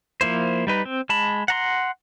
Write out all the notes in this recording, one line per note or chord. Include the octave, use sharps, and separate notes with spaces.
F3 A#3 E4 C5
G3 D#4 B4
C4
G#3 A5 B5
F#5 A#5 C6